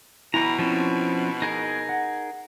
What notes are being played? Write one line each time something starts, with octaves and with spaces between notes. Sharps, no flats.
B2 E4 G#5 A#5 B5
F3 C4 C#4
D#4 G#4 A#4
F#5